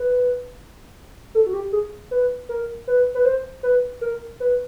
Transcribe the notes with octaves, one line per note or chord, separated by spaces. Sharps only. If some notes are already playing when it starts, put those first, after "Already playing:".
Already playing: B4
A4
F#4
G4
G#4
B4
A#4
B4
B4
C5
B4
A#4
B4